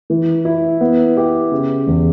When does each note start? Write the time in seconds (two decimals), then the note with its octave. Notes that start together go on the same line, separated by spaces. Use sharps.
0.10 E3
0.45 E4
0.81 B3
1.17 G4
1.52 C#3
1.87 E2